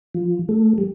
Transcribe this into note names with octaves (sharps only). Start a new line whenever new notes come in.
F3
A3
G3